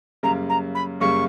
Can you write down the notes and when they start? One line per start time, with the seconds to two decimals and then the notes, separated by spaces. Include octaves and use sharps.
0.23 F#2 C#3 G3 A#3 A#5
0.49 A#5
0.74 B5
1.00 F#2 C#3 G3 A#3 C#6